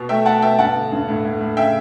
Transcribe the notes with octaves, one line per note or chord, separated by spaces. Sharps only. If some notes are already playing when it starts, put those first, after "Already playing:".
Already playing: B2
A3 E5 G5
A3 F#5 A5
B2 E5 G5
G2 F#5 A5
D3
G2
A2
A2
A2
C#3 E5 G5